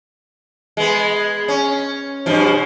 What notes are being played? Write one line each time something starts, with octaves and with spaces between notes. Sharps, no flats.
G#3 B3
C#4
G2 B2 F3